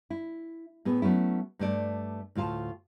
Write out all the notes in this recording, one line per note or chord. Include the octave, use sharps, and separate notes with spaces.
E4
A2 B3 G#4
F#3 A3 B3 C#4 E4
G2 A3 D5
D2 A2 F4 F5 A5